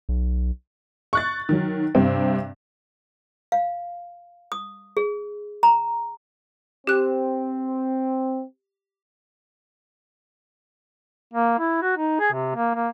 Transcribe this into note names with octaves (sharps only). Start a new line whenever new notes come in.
B1
C#6 F#6 A6
D#3 F#3
G2 C3 C4 G5
F5
D#6
G#4
A#5
C4 G4 F#6
A#3
E4
F#4
D#4
G#4
C3
A#3
A#3